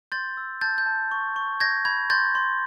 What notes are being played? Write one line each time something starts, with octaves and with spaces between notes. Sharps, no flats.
C6 G6 A6
E6
A5 G6 A6
G6
A5
C#6
C#6
G6 G#6 A#6
B5 G#6
C6 G6 A6
C6